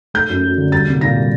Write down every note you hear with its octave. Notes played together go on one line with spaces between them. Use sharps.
A3 G6
F#2
F#3
D3
G3 A6
C2
A#2 A#6
G3